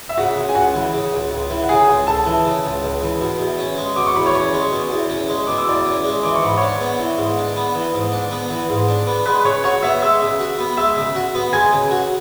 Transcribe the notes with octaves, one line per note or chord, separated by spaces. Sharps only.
E5
C#3 F#4 F#5
C#2
G#5
C#2 F#4 F#5
E3
C#3
C#2
C#2
E3
F#5
C#3 G#4 G#5
C#2
C#2 A4 A5
E3
C#3
C#2
C#2
E3
B2
E2
C#4
G#3
B2 D6
C#6
E2 B5
C#5 C#6
C#4
G#3
B2
E2
C#4
G#3
B2 D6
E6
E2 D5 D6
C#4
G#3
E3 D6
C#6
G#2 B5
D4 C#5 C#6
B3
E3
G#2
D4
B3
E3
G#2
D4
B3
E3
G#2
D4
B3
G#3 B4 B5
C#3 C#5 C#6
F#4 C#5 C#6
B3 E5 E6
G#3 E5 E6
C#3
F#4
B3
G#3 E5 E6
C#3
F#4
B3
G#3 G#5 G#6
C#3
F#4